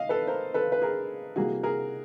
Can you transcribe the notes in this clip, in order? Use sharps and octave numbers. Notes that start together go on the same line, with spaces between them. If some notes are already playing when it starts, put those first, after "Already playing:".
Already playing: D#3 D#5 F5
A4 B4
A#4 C5
A4 B4
B4
G#4 A#4
C3 E3 G3 A#3 F#4 G#4
G#4 A#4